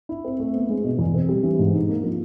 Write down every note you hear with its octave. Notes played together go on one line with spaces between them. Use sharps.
E4
C4
A3
B3
G#3
B2
E2
C4
G3
E3
G#2
D#4
A#3
F3